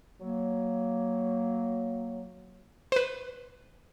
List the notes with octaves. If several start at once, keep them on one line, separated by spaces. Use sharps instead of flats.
F#3 A#3
B4 C5